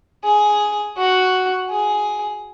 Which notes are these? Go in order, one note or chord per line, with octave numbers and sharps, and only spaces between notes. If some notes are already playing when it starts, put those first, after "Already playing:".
G#4
F#4
G#4